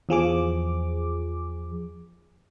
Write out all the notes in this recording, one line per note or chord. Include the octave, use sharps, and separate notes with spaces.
E2 F3 G#4 D6